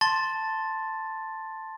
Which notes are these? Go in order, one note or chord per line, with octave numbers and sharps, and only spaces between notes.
A5 C6 A6